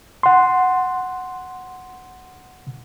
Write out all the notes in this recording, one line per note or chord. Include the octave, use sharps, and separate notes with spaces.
F#5 C6